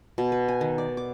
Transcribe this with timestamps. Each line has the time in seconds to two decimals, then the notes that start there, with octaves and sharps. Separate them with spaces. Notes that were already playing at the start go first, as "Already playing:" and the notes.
0.18 B2
0.32 B4
0.48 G#5
0.61 D#3
0.78 D5
0.97 D6